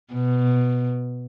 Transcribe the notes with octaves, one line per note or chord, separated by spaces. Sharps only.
B2